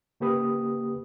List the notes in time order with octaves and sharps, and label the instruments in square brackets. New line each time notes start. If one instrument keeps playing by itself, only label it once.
[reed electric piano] C#3 A#3 G4 B4 D#6